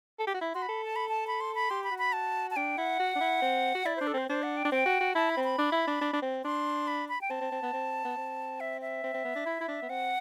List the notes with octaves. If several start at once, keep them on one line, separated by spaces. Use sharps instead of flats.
A4
G4
F#4
E4
F#4 C6
B5
A4
A5
B5
A5
B5
C6
B5
G4 C6
B5
F#4
B5
A5
A5
D4 G5
E4 F#5
F#4
D4
E4
C4
F#4
E4 D5
D4 C5
A4
C4 C5
D4 C5
F#5
G5
D4
C4 G5
F#4
F#4
E4 A5
B5
C4
B5
D4
E4
D4
D4
D4
C4
D4 C6
B5
B5
G5
C4 A5
C4
C4
B3
C4
B3
C4
E5
E5
C4
C4
B3
D4
E4
E4
D4
B3
C4 F#5